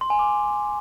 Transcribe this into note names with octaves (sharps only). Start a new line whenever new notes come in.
C6
G#5
D6